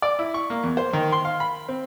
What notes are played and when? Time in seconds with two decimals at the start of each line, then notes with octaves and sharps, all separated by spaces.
0.02 D5
0.19 E4
0.34 C#6
0.50 A#3
0.63 E2
0.77 C5
0.93 D#3
1.12 C6
1.25 F5
1.40 B5
1.68 C4